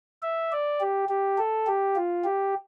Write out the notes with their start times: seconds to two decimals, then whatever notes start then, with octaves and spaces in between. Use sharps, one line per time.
0.23 E5
0.52 D5
0.81 G4
1.09 G4
1.38 A4
1.67 G4
1.96 F4
2.24 G4